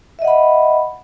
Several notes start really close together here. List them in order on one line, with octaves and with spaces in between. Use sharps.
E5 D#5 F#5 B5